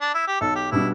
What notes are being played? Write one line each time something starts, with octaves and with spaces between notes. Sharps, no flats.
D4
E4
G4
B1 A4
G4
B2 G3 D4 E4